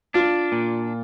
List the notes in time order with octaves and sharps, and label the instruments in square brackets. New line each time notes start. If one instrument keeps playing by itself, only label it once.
[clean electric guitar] D4 [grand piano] F4
[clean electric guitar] A#2